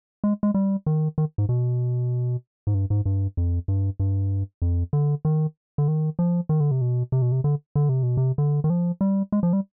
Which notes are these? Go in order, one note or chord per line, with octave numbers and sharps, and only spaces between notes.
G#3
G#3
G3
D#3
D#3
G#2
B2
G#2
G2
G#2
G2
F2
G2
G2
F2
D3
D#3
D3
D#3
F3
D#3
D3
C3
B2
C3
B2
C3
D3
D3
C3
B2
C3
D3
D#3
F3
G3
G#3
F3
G3